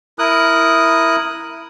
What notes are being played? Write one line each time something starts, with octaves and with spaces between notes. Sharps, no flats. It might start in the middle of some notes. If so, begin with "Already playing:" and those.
E4 A#4 D#6 F#6